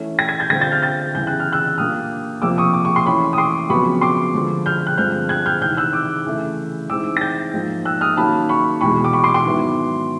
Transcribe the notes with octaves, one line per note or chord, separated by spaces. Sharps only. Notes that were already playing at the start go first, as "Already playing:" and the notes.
Already playing: E3 A3 C#4
G#6 A#6
G#6 A#6
G6 A6
D3 G3 C4 F4 G#6 A#6
G6 A6
F6 G6
G6 A6
E2 C#3 E3 G3 G6
F#6
F6
E6 F#6
A#2 G3 A#3 D4 D#6 F6
F2 C3 F3 A#3 D6 E6
C#6 D#6
D6
C#6
C6
E3 A3 C#4 B5 C#6
D#6
C6 D6
F2 C#3 F#3 B3 B5 C#6
C6 D6
D3 F3 G#3
F6 G6
F#6
G2 D3 F3 G#3 C4 F6 G6
F#6 G#6
F6 G6
E2 C3 D#3 F6 G6
E6 F#6
D6 E6
C#3 E3 A3
E3 G#3 C4 D#4 D6 E6
A#6
G6 A6
G#2 F3 A#3 D#4
E6 F#6
D#6 F6
D#3 F#3 A#3 C#4 A5 B5
B5 C#6
E2 B2 G#3 B5 C#6
D6
B5 C#6
C6 D6
C6 D6
G#2 D#3 F#3 B3 E4